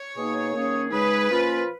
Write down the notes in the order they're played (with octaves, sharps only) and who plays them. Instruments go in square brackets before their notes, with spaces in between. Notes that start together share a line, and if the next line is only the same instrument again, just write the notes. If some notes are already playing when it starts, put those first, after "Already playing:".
Already playing: [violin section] C#5
[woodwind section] B2 A#3 D#4 G#4
D#3 A#3 C#4 G#4
[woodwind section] C#3 G#3 D#4 G#4 [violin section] B4
[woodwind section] A#2 F3 A#3 C#4 F4